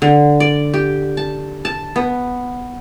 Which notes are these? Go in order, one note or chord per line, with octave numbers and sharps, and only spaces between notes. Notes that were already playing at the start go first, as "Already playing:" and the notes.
D3
D5
G4
A5
A5
B3